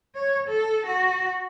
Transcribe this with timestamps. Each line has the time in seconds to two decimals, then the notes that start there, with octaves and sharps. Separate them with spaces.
0.15 C#5
0.48 A4
0.87 F#4